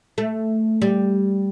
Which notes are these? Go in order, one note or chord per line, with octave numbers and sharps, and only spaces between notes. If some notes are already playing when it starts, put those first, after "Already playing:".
A3
G3